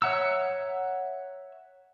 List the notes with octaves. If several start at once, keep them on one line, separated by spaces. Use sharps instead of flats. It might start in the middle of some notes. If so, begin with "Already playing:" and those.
C#5 E5 F#5 A#5 E6